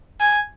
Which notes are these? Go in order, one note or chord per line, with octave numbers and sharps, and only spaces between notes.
G#5